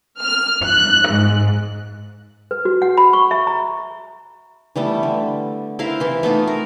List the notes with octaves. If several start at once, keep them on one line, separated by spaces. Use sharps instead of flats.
F6
F#6
G#2
B4
F#4
F#5
B5
C#6
E5
A#5
E3 G3 A3 B3
D3
E4 A#4 C5 F5
C3 E3 C6
A3 B3 D#4 F4
A#4